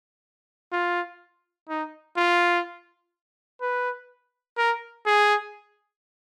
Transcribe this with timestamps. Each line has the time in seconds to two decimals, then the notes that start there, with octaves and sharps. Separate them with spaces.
0.72 F4
1.69 D#4
2.17 F4
3.61 B4
4.57 A#4
5.06 G#4